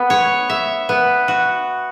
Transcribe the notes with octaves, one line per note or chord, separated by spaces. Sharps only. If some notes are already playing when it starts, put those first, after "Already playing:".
Already playing: B3
C#5
E5
B3
F#4